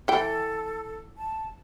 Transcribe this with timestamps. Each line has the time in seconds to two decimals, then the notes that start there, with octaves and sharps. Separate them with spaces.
0.08 E3 A4 G5
1.17 A5